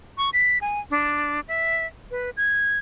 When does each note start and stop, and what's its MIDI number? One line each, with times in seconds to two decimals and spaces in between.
0.18 0.30 85
0.33 0.58 95
0.61 0.80 80
0.90 1.40 62
1.48 1.86 76
2.11 2.30 71
2.37 2.79 92